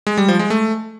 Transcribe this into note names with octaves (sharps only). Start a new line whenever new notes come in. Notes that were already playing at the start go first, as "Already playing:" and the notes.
G#3
G3
F3
G#3
A3